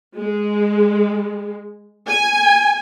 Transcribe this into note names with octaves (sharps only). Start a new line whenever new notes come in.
G#3
G#5